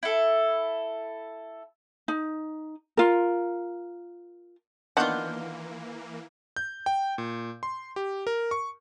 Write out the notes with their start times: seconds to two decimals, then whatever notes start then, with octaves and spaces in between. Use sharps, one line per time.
0.03 E4 A4
2.08 D#4
2.97 F4 A#4
4.97 D#3 E3 A#3 B3 D4 F4 F#5 G6
6.57 G6
6.86 G5
7.18 A#2
7.63 C6
7.96 G4
8.27 A#4
8.51 C#6